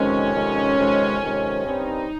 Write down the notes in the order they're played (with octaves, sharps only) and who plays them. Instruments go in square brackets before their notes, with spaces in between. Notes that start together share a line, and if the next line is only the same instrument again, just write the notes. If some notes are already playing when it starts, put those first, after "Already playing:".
Already playing: [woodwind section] F2 C3 D#3 G#3 [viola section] C#4
[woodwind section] F2 C3 D#3 G#3
F2 C3 D#3 G#3
F2 C3 D#3 G#3
[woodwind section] G2 G3 C4 [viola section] D#4